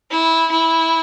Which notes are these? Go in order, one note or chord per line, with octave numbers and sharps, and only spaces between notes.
E4
E4